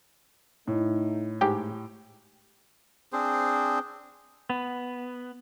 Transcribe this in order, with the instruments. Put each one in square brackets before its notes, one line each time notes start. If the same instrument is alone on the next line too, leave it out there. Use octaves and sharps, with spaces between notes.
[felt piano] A2 [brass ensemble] A3 D#4
[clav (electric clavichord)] G#2 G4 G5 [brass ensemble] A3
[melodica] C4 D4 G#4 C5
[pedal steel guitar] B3